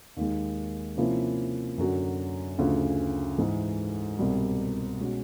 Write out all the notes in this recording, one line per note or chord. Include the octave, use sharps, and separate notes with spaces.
D#2 D#3 G#3
C3 F3 A#3 C#4 E4
F#2 D3 F#3
D2 C#3 F3
G#2 E3 G#3
C2 B2 G3
B2 G#3 C#4 F#4